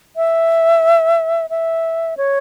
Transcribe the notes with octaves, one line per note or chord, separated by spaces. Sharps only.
E5
E5
C#5